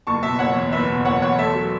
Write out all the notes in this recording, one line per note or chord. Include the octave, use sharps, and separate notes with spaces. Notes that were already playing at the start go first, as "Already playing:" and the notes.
F#1 A5 C#6
B2 E5 A5
F#1 C#5 F#5
E2
F#1 B4 E5
B2
F#1 C#5 F#5
E2 C#5 F#5
A3 E5 A5
F#3